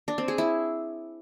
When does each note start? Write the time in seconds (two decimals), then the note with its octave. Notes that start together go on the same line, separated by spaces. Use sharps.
0.08 D4
0.18 C4
0.28 G#4
0.38 E4